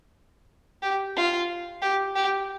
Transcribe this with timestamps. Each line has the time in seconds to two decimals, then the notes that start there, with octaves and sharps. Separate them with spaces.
0.82 G4
1.17 F4
1.82 G4
2.15 G4